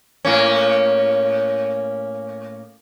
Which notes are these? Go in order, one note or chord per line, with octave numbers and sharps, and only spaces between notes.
A2 A#3 C#4